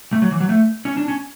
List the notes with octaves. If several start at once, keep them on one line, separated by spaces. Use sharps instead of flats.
A3
F#3
E3
F#3
A3
C#4
D4
C#4